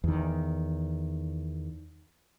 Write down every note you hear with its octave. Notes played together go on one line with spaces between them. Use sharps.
E2 D#3